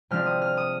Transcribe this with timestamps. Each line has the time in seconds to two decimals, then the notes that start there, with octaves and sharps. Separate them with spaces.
0.10 C3 F3 G#3 D4 F6
0.26 D#6
0.42 F6
0.57 D#6